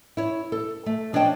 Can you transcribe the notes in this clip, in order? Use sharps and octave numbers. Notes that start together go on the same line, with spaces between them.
E4 C#5
A4
A3
F3 D4 C#5 D#5 G5 A5